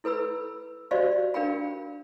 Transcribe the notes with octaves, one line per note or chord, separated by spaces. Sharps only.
E4 A4 B4 B5 E6
F#4 G4 C5 D5 D#5 F5
D4 A#4 F5 G5 B5